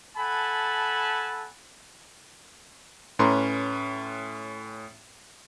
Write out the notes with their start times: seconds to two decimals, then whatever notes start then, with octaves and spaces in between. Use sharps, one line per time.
0.17 A4 F#5 G#5 A5 B5
3.19 A2 C#4 B4 A#5 C6